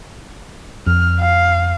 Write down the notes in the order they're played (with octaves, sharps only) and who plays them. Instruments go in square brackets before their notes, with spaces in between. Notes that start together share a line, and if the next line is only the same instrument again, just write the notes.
[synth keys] F2 [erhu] F6
[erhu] F5